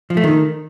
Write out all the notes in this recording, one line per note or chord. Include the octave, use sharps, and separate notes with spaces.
F3
A3
D#3